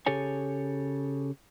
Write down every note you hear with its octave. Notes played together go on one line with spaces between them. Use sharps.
C#3 G4 A4 C#5 G#5